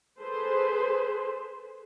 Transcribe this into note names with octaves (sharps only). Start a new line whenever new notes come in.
G#4 A4 B4 C5